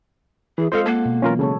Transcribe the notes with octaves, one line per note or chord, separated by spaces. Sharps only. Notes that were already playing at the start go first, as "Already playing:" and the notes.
E3 G#4
G#3 C4 F4 A4 C5 D#5 F5
A#3 A4 F#5
B2
E3 F#3 C#4 F4 A#4
C#3 G#3 A4 C#5